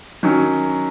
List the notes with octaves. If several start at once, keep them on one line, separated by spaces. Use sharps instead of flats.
D#3 F#3 C#4